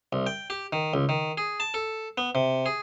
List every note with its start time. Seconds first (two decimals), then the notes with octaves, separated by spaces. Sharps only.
0.13 C2
0.27 G5
0.50 G4
0.73 D#3
0.94 C#2
1.09 D#3
1.37 G#4
1.60 A5
1.74 A4
2.18 B3
2.35 C3
2.66 G#4